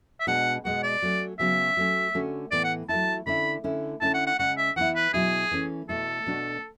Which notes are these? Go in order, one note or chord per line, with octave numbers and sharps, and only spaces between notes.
E5
B2 G#3 D4 F#5
B2 G#3 B3 F#5
D5
F#3 A3 C#4
C#3 F#3 B3 F#4 E5
F#3 A3 C#4
D3 A3 C#4 F#4
A2 E3 B3 D5
F#5
F#3 A3 E4 A5
D3 A3 C#4 E4 B5
D3 A3 C#4 E4
D3 A3 C#4 E4 A5
F#5
F#5
C#3 G#3 C#4 F#5
E5
E3 B3 E4 F#5
B4
B2 F#3 C#4 E4 G#4
E3 A3 C#4
B2 A3 E4 A4
B2 A3 D4 F#4